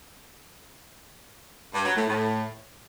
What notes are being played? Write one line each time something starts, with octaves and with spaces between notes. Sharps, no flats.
G2
F#3
A2
A2